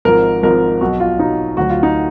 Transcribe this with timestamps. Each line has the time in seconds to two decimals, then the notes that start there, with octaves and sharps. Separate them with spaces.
0.05 G#1 G#2 F3 A#4
0.43 G#1 G#2 F3 A#4
0.81 B1 B2 F#3 F#4
1.00 F4
1.19 B1 B2 F#3 D#4
1.57 D2 D3 F#3 F#4
1.70 F4
1.83 D#4